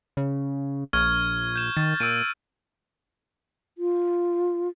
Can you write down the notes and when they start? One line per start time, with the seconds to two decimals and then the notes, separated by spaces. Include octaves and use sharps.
0.17 C#3
0.93 A#1 C#6 F6 G#6
1.56 G6 E7
1.77 D#3 A6
2.00 A#2 E6 D7 D#7
3.78 F4